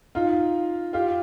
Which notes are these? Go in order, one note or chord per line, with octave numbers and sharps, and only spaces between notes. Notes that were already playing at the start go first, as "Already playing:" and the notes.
D#4 F4
F4 G4